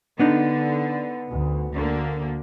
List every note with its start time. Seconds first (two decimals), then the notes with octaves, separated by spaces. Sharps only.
0.19 D3 B3 D4 D#4
1.29 D2
1.75 D2 D3 A#3